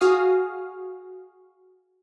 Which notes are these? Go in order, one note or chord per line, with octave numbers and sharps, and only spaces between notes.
F#4 G#4 F5 D#6 F6